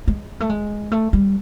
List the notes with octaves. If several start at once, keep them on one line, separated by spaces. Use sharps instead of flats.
G#3
A3
G#3
A3
G3